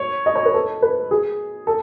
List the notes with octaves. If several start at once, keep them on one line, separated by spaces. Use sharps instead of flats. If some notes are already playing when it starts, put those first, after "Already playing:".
Already playing: C#5
D#5
C#5
B4
A4
B4
G#4
A4